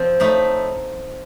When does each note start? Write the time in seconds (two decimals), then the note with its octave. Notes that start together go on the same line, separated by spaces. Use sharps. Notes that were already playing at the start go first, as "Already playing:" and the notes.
Already playing: F3 C4
0.20 A2 A3 D#4